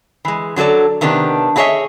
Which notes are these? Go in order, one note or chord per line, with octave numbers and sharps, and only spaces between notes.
E3 G#3
D3 F#3 A3 A4 D5
C3 D#3 B3 D4 G4
E4 F#4 G#4 C#5 D#5 E5